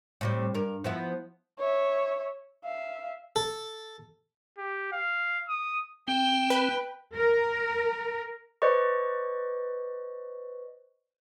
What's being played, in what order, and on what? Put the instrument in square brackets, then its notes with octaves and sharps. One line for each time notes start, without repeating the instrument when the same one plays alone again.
[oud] A2 C3 G3
G2 A#4
F3 B3 E4
[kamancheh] C#5 E5
E5 F5
[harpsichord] A4
[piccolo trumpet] G4
F5
D#6
[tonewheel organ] C4 [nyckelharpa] G5
[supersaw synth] B4
[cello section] A#4
[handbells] B4 C5 D5 D#5 C#6